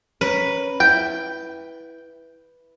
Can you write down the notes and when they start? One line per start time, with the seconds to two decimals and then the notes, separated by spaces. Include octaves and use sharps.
0.21 C#4 A#4 B4
0.80 E4 G5